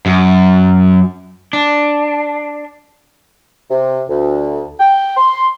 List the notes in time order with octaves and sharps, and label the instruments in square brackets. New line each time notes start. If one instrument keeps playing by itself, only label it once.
[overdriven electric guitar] F#2
D4
[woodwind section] C3
D2
G5
C6